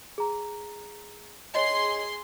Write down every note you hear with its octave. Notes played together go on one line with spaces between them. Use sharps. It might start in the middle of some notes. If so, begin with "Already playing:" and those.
G#4 A#5
G#4 C#5 D#5 C6